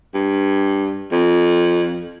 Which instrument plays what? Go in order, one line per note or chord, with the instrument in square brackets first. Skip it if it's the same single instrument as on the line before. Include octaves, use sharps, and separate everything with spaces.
[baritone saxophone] G2
F2